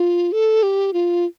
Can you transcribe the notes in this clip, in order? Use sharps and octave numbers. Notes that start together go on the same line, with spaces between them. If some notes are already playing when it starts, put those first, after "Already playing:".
Already playing: F4
A4
G4
F4